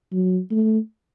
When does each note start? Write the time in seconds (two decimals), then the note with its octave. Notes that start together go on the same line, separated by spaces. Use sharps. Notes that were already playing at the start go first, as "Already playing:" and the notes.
0.12 F#3
0.51 A3